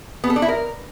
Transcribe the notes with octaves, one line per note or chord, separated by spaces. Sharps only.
B3
A4
D4
E4
A#4